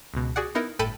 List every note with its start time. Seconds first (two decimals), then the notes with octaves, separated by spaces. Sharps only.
0.14 C#2 B2
0.36 F#4 G#4 D5 F#5
0.55 B3 D#4 E4 A#4
0.79 G1 A2 A4 G5 B5 D#7